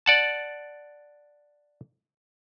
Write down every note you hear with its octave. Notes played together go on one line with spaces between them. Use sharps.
D5 F#5 A5